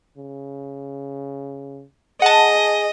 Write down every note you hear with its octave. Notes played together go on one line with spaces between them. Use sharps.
C#3
G#4 D#5 F#5 A5